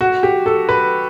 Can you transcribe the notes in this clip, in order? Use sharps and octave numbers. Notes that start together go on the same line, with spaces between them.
F#4
G4
A4
B4